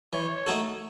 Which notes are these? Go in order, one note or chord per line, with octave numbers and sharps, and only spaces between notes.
E3 C#5
A3 D#4 F#4 A4